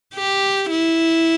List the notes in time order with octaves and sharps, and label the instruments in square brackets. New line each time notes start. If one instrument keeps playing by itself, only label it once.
[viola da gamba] G4
E4